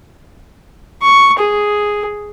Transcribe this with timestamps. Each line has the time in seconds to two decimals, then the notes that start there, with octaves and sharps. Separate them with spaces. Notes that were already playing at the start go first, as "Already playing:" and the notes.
1.02 C#6
1.39 G#4